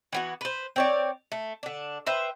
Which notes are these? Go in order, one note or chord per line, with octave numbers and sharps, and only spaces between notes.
E3 B3 F#4
B4 C5
C4 C#5 D5
A3
D3 D4
B4 C5 E5 G5